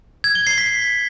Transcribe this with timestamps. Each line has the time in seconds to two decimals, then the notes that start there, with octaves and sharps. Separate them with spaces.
0.24 G#6
0.35 G7
0.47 C7
0.58 B6